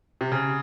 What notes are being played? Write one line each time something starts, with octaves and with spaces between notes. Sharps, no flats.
C3
C#3